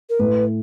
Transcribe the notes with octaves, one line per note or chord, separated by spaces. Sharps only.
A#4
A2 B4